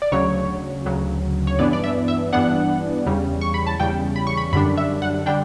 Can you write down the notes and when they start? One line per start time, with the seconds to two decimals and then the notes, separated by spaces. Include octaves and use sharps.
0.02 D5
0.12 D2 C#3 F#3 C#5
0.86 D2 C#3 F#3
1.47 C#5
1.59 G2 E3 B3 D4 D5
1.73 D5
1.84 E5
2.08 E5
2.33 G2 E3 B3 D4 F#5
3.06 E2 C#3 G3
3.41 C#6
3.54 B5
3.67 A5
3.80 E2 C#3 G3 G5
4.16 B5
4.27 C#6
4.37 B5
4.53 F#2 D3 G3 D4 B5
4.77 E5
5.02 F#5
5.26 D3 G3 D4 G5